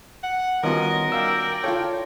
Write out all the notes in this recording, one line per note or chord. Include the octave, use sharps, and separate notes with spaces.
F#5
D#3 G3 B3 C#4 F4 F#4 A#4 D#5
D5 F5 G5 E6
F4 A4 C#5 F5